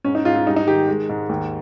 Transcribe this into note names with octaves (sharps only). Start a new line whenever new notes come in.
G#2 C#4
D#4
G#2 F4
F4
G3 D#4
D#4
D#3 G4
G#3
G#2
D#2